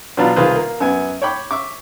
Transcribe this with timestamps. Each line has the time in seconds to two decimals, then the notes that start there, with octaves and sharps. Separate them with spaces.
0.17 B2 F#3 D4 F4 B5
0.36 C2 D#3 F4 G#4 B4 C5
0.56 A#3
0.80 F#2 B3 G#5
1.22 C#5 G5 B5 D6
1.51 E5 C#6 D6